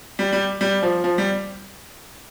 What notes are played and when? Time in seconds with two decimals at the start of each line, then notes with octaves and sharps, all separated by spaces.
0.19 G3
0.33 G3
0.61 G3
0.82 F3
1.04 F3
1.18 G3